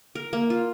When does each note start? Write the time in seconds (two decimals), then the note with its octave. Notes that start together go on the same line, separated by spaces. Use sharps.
0.15 A#4
0.33 A#3
0.50 F4